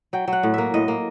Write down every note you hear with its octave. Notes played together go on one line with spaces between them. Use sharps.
F#3 G5
F#3
F#5
A2
A#3 E5
A2 D#5
A#3